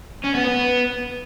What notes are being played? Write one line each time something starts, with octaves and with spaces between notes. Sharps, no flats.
C#4
B3
B3